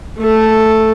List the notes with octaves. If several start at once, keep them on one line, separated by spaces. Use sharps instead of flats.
A3 A4